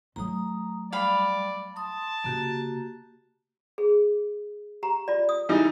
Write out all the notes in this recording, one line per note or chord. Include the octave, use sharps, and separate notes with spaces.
F#3 A3 A#5 D#6
G3 D5 F5 B5
A5 C6 D#6
C#3 A#3 F#4 G4
G#4
G4 A#5
F4 D5
D#6
E3 G3 D#4